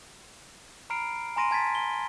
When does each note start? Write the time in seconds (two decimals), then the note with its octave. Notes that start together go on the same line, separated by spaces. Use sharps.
0.90 A#5 B5 F6 C7 D7
1.36 G#5 A#5 C6 A#6 D7 D#7
1.51 A5 G#6 A6 B6
1.75 G7